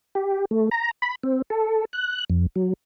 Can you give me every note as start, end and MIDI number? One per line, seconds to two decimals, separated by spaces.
0.15 0.45 67
0.51 0.69 57
0.71 0.91 82
1.02 1.15 83
1.23 1.42 60
1.50 1.85 69
1.93 2.24 90
2.30 2.46 41
2.56 2.73 54